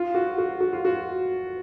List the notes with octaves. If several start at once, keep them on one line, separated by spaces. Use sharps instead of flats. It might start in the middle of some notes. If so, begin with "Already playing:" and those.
Already playing: F4
F#4
F#4
F#4
F4
F#4